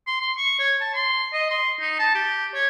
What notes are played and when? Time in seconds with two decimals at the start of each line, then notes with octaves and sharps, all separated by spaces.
0.07 C6
0.20 C6
0.37 C#6
0.59 C#5
0.80 A5
0.94 C6
1.33 D#5
1.50 C6
1.80 D#4
1.99 A5
2.15 G4
2.54 C#5